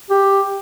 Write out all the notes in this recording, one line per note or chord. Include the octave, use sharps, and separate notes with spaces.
G4